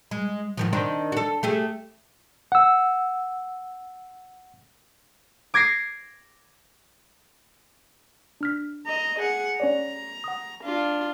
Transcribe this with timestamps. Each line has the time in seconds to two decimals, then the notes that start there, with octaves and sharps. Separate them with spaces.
0.11 G#3
0.57 G#2 D#3 F3
0.73 D#3 C4 D4
1.12 F#4 A4
1.43 A3 G4 G#4
2.52 F#5 E6
5.54 D6 G#6 A#6 C7 D7
8.41 D4 F6 B6
8.87 D#5 A#5
9.20 G#4 F#5
9.60 C#4 C#5 D5 A#5
10.24 F#5 D#6
10.64 D4 F4